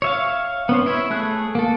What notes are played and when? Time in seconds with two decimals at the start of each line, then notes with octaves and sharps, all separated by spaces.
0.02 C#5 E5 F5
0.69 B3 C#4 C5
0.86 E4 C#5 E5
1.10 A3 G#4 F#6
1.55 A#3 A4